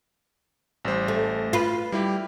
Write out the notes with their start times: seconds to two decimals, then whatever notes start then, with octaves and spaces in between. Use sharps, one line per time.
0.85 A1 G3 C5
1.08 A3
1.53 F4 B4
1.92 G3 E4 G4